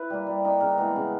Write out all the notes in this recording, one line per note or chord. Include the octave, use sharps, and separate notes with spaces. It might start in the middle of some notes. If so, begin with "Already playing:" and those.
Already playing: E4 B4
G3 A#3
G3
A#3 D#4
C#3 A#4
E3 G#3 B3
C#3